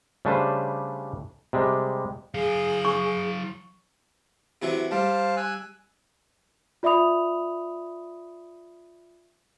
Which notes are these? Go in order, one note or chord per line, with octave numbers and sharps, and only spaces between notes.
C#3 G3 A3 D4 B4 C5
C3 G3 G#3
F#3 G#4 F5
C#6
C3 E3 F#3
G3 C5 F5 A5
G#5 E6 F#6
F4 D5 E5 B5 D#6 F7